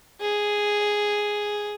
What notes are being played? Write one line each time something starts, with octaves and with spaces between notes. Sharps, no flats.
G#4